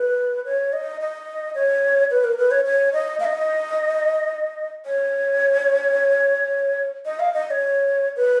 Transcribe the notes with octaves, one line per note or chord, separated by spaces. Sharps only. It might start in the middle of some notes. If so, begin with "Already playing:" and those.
Already playing: B4
C#5
D#5
D#5
C#5
B4
A#4
B4
C#5
C#5
D#5
F5
D#5
C#5
D#5
F5
D#5
D#5
C#5
B4